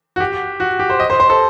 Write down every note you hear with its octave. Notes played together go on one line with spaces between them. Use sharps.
F#4
G4
F#4
G4
C5
D#5
C5
C5
A4